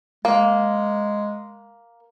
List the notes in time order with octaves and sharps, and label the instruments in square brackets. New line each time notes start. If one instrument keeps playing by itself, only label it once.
[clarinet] G#3 [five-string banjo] A#3